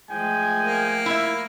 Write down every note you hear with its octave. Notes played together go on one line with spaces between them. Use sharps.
F3 G#3 A3 G5 G#5
A#3
E4 E5